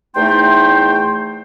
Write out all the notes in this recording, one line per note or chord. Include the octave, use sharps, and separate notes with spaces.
E2 A3 D#4 C5 G5 C6